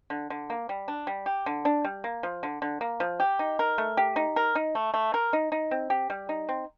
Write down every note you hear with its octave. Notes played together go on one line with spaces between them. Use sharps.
D3
D3
A#3
G3
D4
G3
G4
D3
D4
G3
A#3
F3
D3
D3
A#3
F3
G4
D#4
A#4
A3
G4
D#4
A#4
D#4
A3
A3
A#4
D#4
D#4
C4
G4
G3
D#4
C4